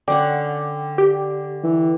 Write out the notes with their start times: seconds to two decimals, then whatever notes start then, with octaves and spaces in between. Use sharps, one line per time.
0.08 D3 C#4 D5 F#5 G5 D6
0.98 G4
1.64 E3